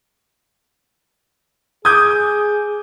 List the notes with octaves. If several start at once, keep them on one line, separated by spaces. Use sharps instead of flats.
G#4 D6 D#6 G6 G#6